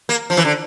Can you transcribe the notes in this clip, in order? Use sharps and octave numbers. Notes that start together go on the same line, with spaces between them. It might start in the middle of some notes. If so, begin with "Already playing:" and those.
A#3
F3
E3
D3